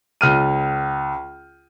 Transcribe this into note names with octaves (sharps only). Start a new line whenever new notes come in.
C#2 F6 D#7